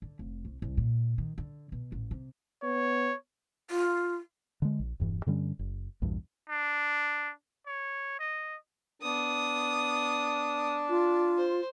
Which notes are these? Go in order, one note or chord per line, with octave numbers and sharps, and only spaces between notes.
D3
F1
C2
C2
A#2
D#3
D3
B2
A1
C3
B3 C#5
F4
D3 G#3
A#1
E1 G2 E3
G2 D3 G3 C#4
F#1
A#1 E2 G2
D4
C#5
D#5
B3 D4 D#6
F4
C5